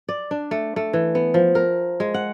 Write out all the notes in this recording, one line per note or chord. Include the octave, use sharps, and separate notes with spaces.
D5
D4
A3
A3
E3
B3
F3
A#4
G#3
F#5